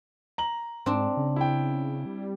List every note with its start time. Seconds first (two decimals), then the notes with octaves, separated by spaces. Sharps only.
0.38 A#5 F#7
0.86 G#2 C4 D4
1.17 C#3
1.36 E4 G5
2.06 G3